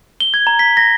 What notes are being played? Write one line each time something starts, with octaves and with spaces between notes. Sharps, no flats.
G7
G#6
A#5
B6
A#6